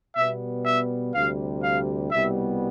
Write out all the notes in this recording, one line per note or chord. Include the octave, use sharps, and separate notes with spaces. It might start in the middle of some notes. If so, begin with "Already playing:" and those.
B2 G3 B3 E5
E5
D2 C3 G3 F5
F5
C2 B2 G3 B3 E5